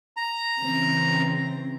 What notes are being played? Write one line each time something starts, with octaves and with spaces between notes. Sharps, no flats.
A#5
C#3 E3 C4